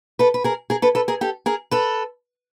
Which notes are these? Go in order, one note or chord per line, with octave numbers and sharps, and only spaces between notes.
A4 B4
B4
G#4 A#4
G#4 A#4
A4 B4
A4 B4
G#4 A#4
G4 A4
G#4 A#4
A4 B4